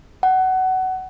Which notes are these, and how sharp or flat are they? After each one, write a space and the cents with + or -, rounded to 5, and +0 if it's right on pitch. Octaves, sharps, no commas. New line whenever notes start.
F#5 +20